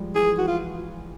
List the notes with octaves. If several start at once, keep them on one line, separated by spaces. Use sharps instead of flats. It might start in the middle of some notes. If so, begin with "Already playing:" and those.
Already playing: F3 G3 G#3
E3 G#4
E3 F#4
F4